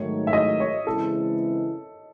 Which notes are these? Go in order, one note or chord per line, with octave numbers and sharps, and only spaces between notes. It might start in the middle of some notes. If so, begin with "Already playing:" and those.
Already playing: G#2 D#3 F#3 A3 D#4 C#5
E5
D#5
C#5
C#3 E3 G#3 C4 E4 A4